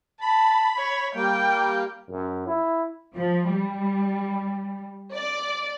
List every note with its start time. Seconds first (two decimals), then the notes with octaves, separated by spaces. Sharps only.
0.21 A5 B5
0.77 C#5
1.15 G3 A#3 G5
2.10 F#2
2.47 E4
3.14 F3
3.47 G3
5.14 D5